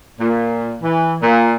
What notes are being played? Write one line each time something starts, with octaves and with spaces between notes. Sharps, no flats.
A#2
E3
A#2